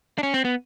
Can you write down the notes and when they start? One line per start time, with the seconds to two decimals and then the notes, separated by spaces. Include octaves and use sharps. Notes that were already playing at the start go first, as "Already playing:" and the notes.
0.18 D4
0.23 C#4
0.34 C4
0.45 B3